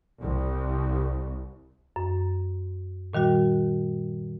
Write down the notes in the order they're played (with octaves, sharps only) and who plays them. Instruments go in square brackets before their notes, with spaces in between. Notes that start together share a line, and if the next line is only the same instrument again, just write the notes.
[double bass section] C2
[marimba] F#2
A#2 D#3 G3 F#4